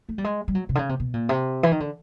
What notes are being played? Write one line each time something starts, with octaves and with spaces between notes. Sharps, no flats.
A3
G3
G#3
G3
F#3
C3
D3
C#3
C3
B2
A#2
C3
E3
D#3
D3